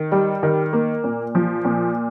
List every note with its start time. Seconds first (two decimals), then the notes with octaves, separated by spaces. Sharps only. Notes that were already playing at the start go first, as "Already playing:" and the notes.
Already playing: D#3
0.12 G3
0.43 D#3
0.73 A#3
1.04 A#2
1.35 F3
1.65 A#2